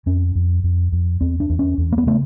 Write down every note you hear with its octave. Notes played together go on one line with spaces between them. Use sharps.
F2 C#4
F2
F2
F2
E2 C4
D4
E2
C#4
E2
A#3
B3
C#3 A3